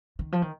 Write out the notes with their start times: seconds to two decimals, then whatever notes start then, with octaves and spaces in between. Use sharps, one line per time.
0.19 D#3
0.32 F3
0.42 D#3